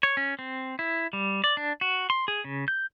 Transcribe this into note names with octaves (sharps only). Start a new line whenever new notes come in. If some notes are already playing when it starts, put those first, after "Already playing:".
C#5
C#4
C4
E4
G3
D5
D4
F#4
C6
G#4
C#3
G6